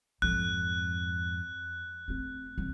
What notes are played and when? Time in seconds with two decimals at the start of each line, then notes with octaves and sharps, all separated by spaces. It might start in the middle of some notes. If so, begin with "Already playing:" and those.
0.22 F2 G#2 F#6
2.08 A3 C4
2.58 C2